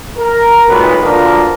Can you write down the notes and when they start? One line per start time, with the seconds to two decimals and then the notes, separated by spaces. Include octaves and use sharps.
0.18 A#4
0.68 B1 A#2 F#3 G#3 B3 B4
1.02 B2 D3 F3 A#3 D4 A#4